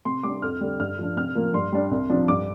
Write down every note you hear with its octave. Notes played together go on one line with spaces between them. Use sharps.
C3 C6
G3 D4 D6
F2 F6
D3 G3
G2 F6
F3 D4
C3 F6
F3 A#3
G2 C6
G3 D4
C2
C3 F3 D4
G2 D6